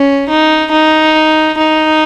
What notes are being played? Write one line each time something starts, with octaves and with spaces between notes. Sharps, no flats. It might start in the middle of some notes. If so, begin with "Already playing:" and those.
Already playing: C#4
D#4
D#4
D#4